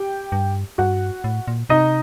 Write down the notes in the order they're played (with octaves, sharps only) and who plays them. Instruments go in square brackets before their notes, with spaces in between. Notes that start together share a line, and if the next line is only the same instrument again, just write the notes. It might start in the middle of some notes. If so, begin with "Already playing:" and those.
Already playing: [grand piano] G4 G5
[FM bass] G2
[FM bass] G2 [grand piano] F#4 F#5
[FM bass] A2
A#2
[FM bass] C3 [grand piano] D#4 D#5